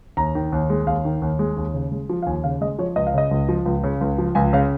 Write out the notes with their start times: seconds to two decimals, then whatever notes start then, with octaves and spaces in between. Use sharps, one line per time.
0.17 D#2 A#5
0.35 D#3
0.52 D#2
0.70 G#3
0.86 D#2 F5
1.05 D#3
1.22 D#2
1.39 G#3
1.56 D#2
1.74 C#3
1.92 G#3
2.09 F3
2.22 F5
2.26 D#2 G#5
2.44 C#3 F5
2.61 G#3 D#5
2.78 F3 C#5
2.96 C#2 D#5
3.07 F5
3.14 C#3 D#5
3.31 C#2
3.49 F3
3.66 C#2
3.84 C#3
4.01 C#2
4.18 F3
4.35 C#2 G#5
4.53 C#3 F5